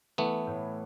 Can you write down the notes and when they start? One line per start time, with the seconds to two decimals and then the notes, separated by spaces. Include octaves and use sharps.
0.18 E3 A3 B3
0.47 A2